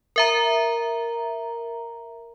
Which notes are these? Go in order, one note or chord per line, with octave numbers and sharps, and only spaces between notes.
A#4 E5 A#5